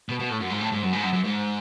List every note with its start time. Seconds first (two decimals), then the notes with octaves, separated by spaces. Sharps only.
0.09 B2
0.19 B2
0.30 A2
0.40 F#2
0.50 G#2
0.61 A2
0.72 G#2
0.82 F#2
0.93 G#2
1.03 F#2
1.13 F#2
1.24 G#2